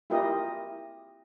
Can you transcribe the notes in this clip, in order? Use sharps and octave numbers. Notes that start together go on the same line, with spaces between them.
E4 F4 G4 A#4 D#5